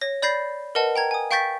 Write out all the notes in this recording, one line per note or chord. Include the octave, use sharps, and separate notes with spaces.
C#5 A#6
D5 B5 G6 A6 A#6 C7
A#4 B4 D#5 F#5 A5
G5 A#5 G#6
G#5 D#6
F5 G5 C#6 G6 A6 B6